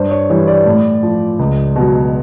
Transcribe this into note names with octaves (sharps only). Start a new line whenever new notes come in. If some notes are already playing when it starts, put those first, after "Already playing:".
Already playing: G2 C5
C#5
E3 G3 C#5
D5
A2
F3
C#2
B2 F#3